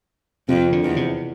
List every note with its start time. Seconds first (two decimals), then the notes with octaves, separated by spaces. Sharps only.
0.49 F2 C3
0.72 D3
0.84 E2
0.96 C3